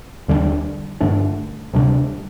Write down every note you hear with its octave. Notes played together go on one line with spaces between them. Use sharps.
D#2 D3 G3 D4
G2 D3 A3 D4
D2 C3 G3 D4